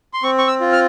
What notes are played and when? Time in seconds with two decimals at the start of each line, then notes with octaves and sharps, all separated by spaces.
0.13 C6
0.23 C4 C#6
0.38 C#6
0.47 E6
0.60 F4
0.72 F6